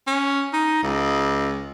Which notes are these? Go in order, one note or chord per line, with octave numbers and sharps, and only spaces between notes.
C#4
D#4
C#2